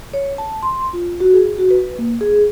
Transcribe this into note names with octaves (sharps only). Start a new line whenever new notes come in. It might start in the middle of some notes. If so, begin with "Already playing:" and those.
C#5
A5
C6
F4
F#4
G#4
F#4
B4
A#3
G#4